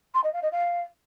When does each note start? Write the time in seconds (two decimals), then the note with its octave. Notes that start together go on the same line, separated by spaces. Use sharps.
0.14 C6
0.24 D#5
0.33 F5
0.43 D#5
0.52 F5